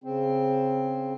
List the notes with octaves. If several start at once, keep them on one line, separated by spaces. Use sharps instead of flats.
C#3 C4